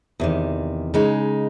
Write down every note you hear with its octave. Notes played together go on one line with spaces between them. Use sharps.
E2 C3 D#3
C#3 G#3 D#4